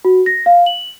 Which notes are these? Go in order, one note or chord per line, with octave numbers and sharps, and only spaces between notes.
F#4
A#6
F5
F#7